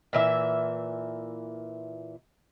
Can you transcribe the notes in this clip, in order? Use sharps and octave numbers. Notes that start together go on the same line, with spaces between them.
A#2 E3 E5